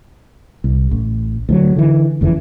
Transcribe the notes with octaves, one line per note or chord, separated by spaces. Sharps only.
C2
A1
D2 D#3 F#3
D3 E3
F#1 F2 C#3 E3